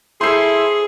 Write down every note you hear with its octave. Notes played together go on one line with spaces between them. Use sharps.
E4 G#4 A4 C5 C6 C7